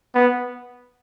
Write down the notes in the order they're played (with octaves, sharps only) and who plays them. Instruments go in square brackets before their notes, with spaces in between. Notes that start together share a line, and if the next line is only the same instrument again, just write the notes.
[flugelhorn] B3